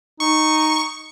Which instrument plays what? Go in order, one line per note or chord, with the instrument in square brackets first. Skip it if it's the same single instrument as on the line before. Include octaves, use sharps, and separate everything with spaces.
[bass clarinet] D#4 [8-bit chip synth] C#6